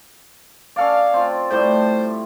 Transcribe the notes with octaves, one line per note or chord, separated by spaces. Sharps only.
C#4 A4 D5 F5
C4 F4
A2 G3 A3 C5